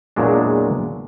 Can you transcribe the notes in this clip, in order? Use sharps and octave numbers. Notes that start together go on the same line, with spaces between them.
E2 A#2 F#3 G#3 D4